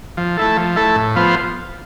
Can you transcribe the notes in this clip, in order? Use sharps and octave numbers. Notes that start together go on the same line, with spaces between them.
F3
A3 E4 A4
F3
A3 E4 A4
A2
F3 B3 F4 C5